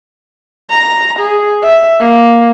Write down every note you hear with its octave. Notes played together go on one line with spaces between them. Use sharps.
A#5
G#4
E5
A#3